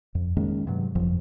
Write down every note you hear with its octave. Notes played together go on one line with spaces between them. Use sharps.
F2
D#3 G#3 A#3 C#4
G2 C3 F#3
G1 F2 F3